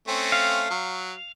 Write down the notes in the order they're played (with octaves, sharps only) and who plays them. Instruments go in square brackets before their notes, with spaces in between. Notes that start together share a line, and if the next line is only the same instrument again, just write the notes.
[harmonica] A3 C4 C#4
[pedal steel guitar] F5
[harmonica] F#3